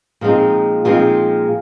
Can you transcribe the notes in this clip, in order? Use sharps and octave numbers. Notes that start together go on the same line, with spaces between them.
A#2 F3 G#3 C4 D#4
A#2 F3 G#3 C4 D#4